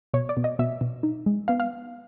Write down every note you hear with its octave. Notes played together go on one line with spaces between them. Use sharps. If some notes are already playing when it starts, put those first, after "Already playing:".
B2 C#5
D5
B2
D#5
B2 E5
B2
D#4
G#3
B3 F5
F5